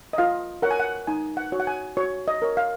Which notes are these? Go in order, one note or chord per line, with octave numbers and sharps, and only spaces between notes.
D#5
F4 F5
A#4 C#5 F#5
G#5
F#5
D#4 G#5
F#5
F#4 C#5
F#5
G#5
F#4 C#5
D#5
A#4 C#5
F5